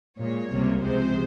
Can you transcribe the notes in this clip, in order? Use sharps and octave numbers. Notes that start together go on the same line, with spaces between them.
A#2 G#3 C#5
C#2 C3 G3 A#3
C#2 C3 F3 G#3 C5